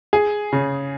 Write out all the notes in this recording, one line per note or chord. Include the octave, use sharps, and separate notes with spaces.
G#4
C#3